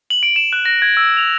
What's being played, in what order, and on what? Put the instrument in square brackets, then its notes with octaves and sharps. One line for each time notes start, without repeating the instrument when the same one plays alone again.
[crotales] F#7
D7
E7
F#6
A#6
G#6
E6
F7